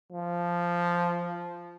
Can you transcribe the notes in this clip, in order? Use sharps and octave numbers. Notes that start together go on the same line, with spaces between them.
F3